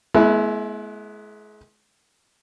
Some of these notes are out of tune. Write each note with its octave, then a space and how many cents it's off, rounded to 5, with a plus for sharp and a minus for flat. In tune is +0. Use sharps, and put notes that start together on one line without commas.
G#3 +35 B3 -35 E4 +0